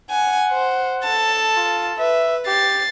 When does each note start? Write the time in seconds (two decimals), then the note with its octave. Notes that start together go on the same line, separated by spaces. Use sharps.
0.10 F#5 G#5
0.51 C5
1.04 A4 A5
1.57 F4
1.98 B4 E5
2.47 G4 A6 C7